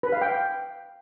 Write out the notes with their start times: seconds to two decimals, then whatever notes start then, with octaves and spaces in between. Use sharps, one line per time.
0.03 B4
0.12 F5
0.21 G5